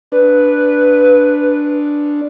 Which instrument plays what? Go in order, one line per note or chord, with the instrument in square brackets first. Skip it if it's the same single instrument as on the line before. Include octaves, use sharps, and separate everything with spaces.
[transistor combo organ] D4 [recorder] B4